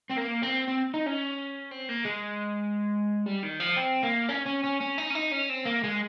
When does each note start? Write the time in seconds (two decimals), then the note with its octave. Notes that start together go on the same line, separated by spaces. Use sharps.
0.11 C4
0.18 A#3
0.43 C4
0.68 C4
0.94 D#4
1.06 C#4
1.71 C4
1.89 A#3
2.05 G#3
3.26 G3
3.43 D#3
3.60 F3
3.77 C4
4.03 A#3
4.29 C#4
4.46 C#4
4.64 C#4
4.80 C#4
4.98 D#4
5.10 C#4
5.15 D#4
5.32 C#4
5.49 C4
5.66 A#3
5.84 G#3